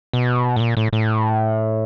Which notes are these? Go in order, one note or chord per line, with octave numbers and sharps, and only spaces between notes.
B2
A2
A#2
A2
A2